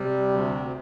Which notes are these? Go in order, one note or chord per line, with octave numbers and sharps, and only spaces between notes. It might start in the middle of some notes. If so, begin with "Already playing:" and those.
Already playing: C3 G3
D2